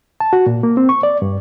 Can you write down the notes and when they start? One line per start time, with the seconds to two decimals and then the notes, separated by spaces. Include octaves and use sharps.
0.20 A5
0.33 F#4
0.46 A#2
0.63 A#3
0.77 C4
0.89 C#6
1.03 D5
1.22 G2